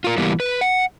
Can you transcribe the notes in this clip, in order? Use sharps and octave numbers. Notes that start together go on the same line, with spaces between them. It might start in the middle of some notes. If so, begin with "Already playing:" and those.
F4 A#4
E3 G3 A#3 B3
B4
F#5